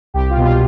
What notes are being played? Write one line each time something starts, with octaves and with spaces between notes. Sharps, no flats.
C2 G4
F4
B2
F4